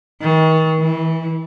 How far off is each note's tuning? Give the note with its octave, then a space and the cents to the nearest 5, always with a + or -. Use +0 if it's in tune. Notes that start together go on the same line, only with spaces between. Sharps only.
D#3 +40
E3 -20